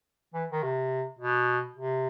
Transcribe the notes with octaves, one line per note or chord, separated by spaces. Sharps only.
E3
D#3
C3
B2
C3